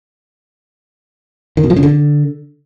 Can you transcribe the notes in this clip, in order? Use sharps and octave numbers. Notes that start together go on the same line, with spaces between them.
D#3
B2
F3
C#3
D3